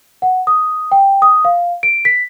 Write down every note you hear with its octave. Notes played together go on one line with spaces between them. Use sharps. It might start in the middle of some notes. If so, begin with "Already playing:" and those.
F#5
D#6
G5
D#6
F5
D7
B6